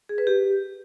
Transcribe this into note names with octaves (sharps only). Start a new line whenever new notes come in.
G#4
B4
G4